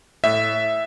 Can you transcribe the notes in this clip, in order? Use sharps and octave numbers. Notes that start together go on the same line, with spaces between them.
A2 E5